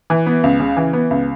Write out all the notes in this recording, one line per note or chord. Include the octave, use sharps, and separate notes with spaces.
E3
B3
C#2
C#3
E3
B3
C#2